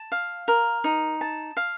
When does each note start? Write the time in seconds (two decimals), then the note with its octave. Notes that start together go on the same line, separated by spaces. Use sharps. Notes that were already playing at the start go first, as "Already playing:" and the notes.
Already playing: A5
0.12 F5
0.48 A#4
0.84 D#4
1.21 A5
1.57 F5